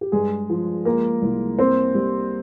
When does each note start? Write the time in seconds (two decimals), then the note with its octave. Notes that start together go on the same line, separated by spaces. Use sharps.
0.01 G4
0.12 G2 G#3 G#4
0.49 F3
0.85 G#3 A#3 A#4
1.22 C2
1.58 A#3 C4 C5
1.95 G3